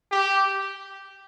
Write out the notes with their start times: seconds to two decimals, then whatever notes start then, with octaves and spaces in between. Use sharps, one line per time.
0.12 G4